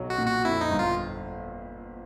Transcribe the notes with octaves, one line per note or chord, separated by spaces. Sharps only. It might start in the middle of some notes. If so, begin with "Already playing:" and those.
Already playing: B1 F#3
F#4
A#2
F#4
F2 E4
D#4
G1
F4